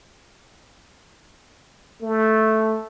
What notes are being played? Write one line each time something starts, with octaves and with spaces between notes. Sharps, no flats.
A3